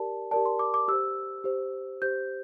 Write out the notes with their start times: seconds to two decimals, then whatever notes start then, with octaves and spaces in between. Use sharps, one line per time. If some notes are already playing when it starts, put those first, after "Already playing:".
Already playing: G4 A#4 D5 A5
0.31 G4 A#4 D5 A5
0.46 C6
0.59 D6
0.74 D6
0.88 G4 C5 E6
1.44 G4 C5
2.02 G4 C5 G6